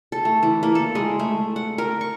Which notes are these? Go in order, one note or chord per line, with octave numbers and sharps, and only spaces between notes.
A4
A3
E3
A#3
A4
G#3
A3
F#5
A#4
C#6